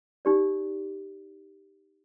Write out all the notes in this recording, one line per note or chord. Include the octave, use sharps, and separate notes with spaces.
D#4 G4 D5